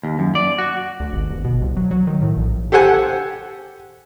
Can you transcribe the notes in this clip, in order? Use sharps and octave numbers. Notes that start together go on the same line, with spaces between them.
D#2
F#2
D5
F#4
D2
G#1
G1
B2
C2
F#3
F#3
D#3
A2
A#1
G4 A4 C5 F#5 G#5